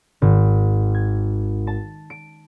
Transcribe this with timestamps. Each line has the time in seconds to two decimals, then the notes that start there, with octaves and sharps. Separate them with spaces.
0.22 G#1
0.95 G#6
1.67 A5
2.10 D7